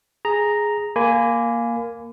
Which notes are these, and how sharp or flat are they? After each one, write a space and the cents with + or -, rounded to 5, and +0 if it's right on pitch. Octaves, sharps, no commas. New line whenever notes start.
G#4 +0 A#5 +0
A#3 +0 G#5 +0 B5 +35